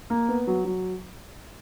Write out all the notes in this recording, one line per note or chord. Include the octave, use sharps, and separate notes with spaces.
A#3
B3
F#3
F#3